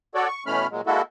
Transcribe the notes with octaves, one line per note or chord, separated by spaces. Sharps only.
F#4 A4 C#5 D5
C#6
B2 E3 A3 C#4 B5 F6
A#2 F#3 G#3
G#3 A#3 E4 F#4 A4